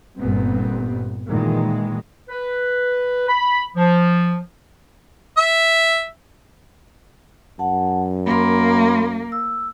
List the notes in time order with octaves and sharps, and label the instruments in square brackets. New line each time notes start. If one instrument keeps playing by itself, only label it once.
[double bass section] G1 G2 A#2 G3 B3 C4
A#2 D#3 E3 G#3
[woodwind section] B4
B5
F3
[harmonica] E5
[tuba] F#2 [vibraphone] F#5 A5
[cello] A#3 [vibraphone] B5 C6
[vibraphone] E6